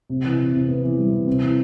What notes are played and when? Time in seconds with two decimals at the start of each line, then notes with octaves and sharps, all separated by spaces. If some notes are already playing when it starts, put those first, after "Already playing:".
0.09 C3
0.24 E3
0.39 E3
0.54 C3
0.68 B3
0.83 E3
0.98 G3
1.13 C3
1.27 C4
1.42 E3